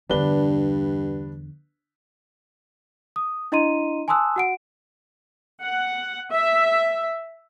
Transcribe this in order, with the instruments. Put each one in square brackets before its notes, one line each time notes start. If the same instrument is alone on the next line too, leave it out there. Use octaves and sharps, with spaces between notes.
[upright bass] E2 D3 [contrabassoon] G2 [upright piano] D4 B4 G7
[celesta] D#6
D4 E4 D#5 A#5 C6 D#7
G#5 A5 C6 D#6 E6 F#6
F#4 F#5 D7
[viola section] F#5
E5